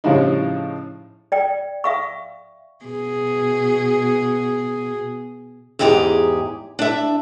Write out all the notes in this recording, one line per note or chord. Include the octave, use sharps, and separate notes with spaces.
A2 C#3 F3 G3 D4 D#4
D5 G5
E5 F5 C#6
B2 G#4
E2 G#2 G4 G#4 A#5
D4 E5